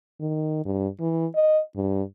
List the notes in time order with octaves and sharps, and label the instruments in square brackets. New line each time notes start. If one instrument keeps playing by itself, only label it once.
[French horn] D#3
G2
E3
D#5
G2